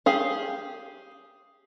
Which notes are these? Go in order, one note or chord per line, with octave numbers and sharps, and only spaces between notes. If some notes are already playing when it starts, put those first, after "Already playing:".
G4 G#4 F5